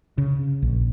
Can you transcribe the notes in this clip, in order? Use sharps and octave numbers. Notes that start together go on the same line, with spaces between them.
C#3
A#1